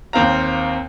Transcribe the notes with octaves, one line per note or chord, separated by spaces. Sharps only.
D#2 C4 F5 A#5